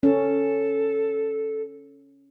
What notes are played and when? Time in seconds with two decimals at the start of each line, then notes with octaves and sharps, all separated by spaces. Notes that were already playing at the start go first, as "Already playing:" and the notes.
0.03 C#4 A4